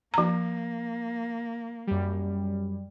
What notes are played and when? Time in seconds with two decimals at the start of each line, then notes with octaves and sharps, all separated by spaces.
0.14 F3 A#3 A#5
1.87 F#2 G3